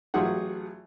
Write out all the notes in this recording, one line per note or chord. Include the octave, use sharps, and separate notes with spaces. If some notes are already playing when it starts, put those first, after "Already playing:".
A1 F#3 F4 G4 G#4 F#5